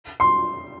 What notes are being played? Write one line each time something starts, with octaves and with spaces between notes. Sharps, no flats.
C6